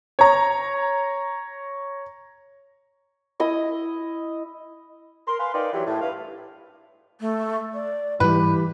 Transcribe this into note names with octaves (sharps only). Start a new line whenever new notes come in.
C#5 A#5
E4 D#5 D#6
A#4 C6
B4 F5 G#5 C6
D#4 A#4 B4 D5 F5 G5
E3 F#3 G4
A2
G2 E4 B4 F5
A3
D5
G#2 E3 G3 G4 B4